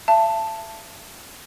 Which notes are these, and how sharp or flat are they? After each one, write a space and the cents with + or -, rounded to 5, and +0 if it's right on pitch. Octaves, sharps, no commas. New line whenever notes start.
E5 +40 A5 +5